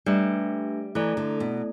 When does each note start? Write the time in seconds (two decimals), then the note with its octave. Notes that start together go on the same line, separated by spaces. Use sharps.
0.06 G3 A3 D4 G4 B4 E5
0.95 E3 A3 E4 A4 D5
1.17 D3
1.40 B2